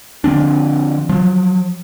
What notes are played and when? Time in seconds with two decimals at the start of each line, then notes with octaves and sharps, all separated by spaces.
0.24 D3 F3 C4 D4
1.09 F3 F#3